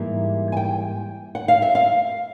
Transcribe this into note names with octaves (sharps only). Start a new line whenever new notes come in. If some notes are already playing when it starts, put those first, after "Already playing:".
Already playing: G#2 E3 G3 A#3 E5
G#5
G5
F#5
F5
E5
F5